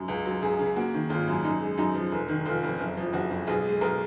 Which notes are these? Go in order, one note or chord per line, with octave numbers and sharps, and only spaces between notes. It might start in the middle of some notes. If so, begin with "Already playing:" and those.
Already playing: F#2
C#2
F#3
C#2 G#4
C#3
A#3 F#4
D#3
G#1 F4
F#2
F#2 D#4
G#3
F#2 D#4
F3
F1
D#3
F1 F4
F2
F#1
F3
F#1 F#4
F2
B1 G#4
G#3
B1 A#4